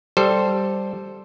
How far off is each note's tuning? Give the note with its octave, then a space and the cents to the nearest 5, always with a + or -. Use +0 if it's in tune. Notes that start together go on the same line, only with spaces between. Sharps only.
G3 +0 A4 +0 C5 +0